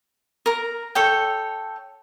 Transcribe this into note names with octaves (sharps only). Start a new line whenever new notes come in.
A#4 A#5
A4 C#5 G5